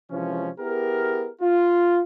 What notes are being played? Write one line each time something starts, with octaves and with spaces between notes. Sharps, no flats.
C3 E3 F3 G#3 C#4
B3 E4 G4 G#4 A#4
F4